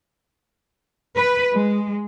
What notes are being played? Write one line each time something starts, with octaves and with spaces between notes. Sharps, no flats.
B4
G#3